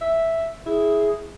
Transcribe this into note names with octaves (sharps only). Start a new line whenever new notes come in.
E5
E4 G#4